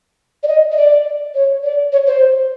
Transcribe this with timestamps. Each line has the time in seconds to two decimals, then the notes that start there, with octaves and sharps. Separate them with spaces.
0.43 D5
0.48 D#5
0.72 D#5
0.77 D5
1.35 C#5
1.64 D5
1.92 C#5
2.07 C5